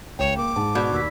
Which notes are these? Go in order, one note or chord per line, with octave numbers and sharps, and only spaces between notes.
C#2 C#5 G5 E7
A#3 D6
G#2 A5
B2 D#4 D5 G#6
D#2 B5 E6 B6